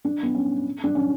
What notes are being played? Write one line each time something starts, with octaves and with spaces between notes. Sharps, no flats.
D4
B3
C#4
D4
C#4